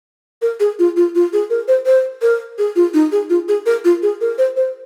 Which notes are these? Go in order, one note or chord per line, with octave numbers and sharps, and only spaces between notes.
A#4
G#4
F4
F4
F4
G#4
A#4
C5
C5
A#4
G#4
F4
D#4
G#4
F4
G#4
A#4
F4
G#4
A#4
C5
C5